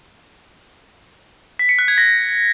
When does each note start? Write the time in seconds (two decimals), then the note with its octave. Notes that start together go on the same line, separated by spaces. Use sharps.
1.59 B6
1.69 C#7
1.79 F#6
1.88 G#6
1.98 A#6